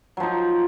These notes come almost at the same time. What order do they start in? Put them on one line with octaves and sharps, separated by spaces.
F#3 F3 D#4